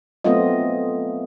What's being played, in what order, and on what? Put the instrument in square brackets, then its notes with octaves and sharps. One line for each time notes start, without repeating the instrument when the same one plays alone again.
[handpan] F#3 A3 B3 C4 F4 D#5